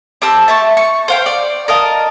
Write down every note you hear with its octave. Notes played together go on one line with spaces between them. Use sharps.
C4 G4 A5 E6
E5 A5 C#6
C#6
C5 F5 G5
D5
A#4 D#5 F5 A5